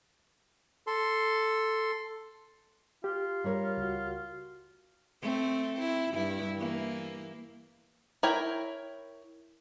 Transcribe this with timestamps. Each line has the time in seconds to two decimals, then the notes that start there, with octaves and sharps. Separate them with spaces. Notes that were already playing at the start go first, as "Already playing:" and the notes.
0.87 A4 C6
3.04 F4 G4
3.44 G3 A#4 C#5
3.77 C#2 F#4
5.22 A3 C4
5.76 C4 E4
6.13 G2 E4
6.58 E3 A#3
8.23 E4 A#4 C#5 G5